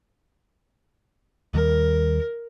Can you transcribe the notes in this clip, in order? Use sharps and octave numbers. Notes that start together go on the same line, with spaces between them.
D#2 D#3 G3 A#4